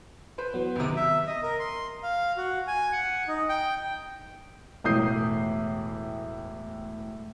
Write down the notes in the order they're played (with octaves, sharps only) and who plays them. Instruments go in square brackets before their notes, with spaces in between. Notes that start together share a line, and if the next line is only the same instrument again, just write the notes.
[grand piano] B4 C5
[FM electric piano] E3 F#3 B3
[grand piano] G#1 C3
[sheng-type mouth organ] E5
D#5
A#4
C6
F5
F#4
G#5
F#5
D#4
G5
[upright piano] E1 A2 E3 D#6 G6 C7